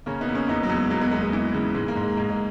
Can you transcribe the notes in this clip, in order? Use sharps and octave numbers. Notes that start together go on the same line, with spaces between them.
C#3 A#3 C#4
B3 D#4
E2
A#3 C#4
E2 B3 D#4
F#3
E2
G#3
E2 F#3 A#3
G#3 B3
E2 G#3
G#3
E3
C#3
G#2 G#3
A#3
G#2
G#3
G#2 A#3
G#3